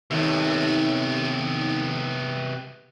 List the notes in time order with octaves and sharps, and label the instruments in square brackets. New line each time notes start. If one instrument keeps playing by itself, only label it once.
[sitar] D#2 A3 [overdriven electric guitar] C3 B3